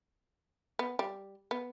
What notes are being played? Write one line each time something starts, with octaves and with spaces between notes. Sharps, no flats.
B3
G3
B3